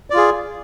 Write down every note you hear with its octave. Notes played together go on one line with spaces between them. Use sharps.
F4 G#4 D5